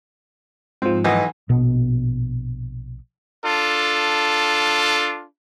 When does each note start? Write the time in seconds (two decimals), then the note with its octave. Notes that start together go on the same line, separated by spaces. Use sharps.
0.82 G#2 F3 C4
1.04 B1 E3 D#5
1.49 A#1 B2 B3
3.45 D4 F4 A4